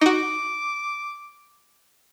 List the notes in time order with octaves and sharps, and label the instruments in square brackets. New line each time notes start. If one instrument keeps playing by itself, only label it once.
[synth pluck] D#4 F#4 [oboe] D6